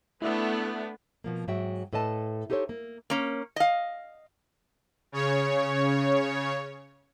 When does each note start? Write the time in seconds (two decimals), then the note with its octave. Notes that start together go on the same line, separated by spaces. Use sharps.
0.22 A3 B3 D4 E4 D5 E5
1.24 B2 F3 A#3
1.48 G#2 F#3 E5 G5
1.93 A2 A4 B4 D#5 A5
2.50 D#4 G4 A4 C5 C#5
2.69 A#3
3.10 A#3 C#4
3.56 D#5 F5
5.12 C#3 C#5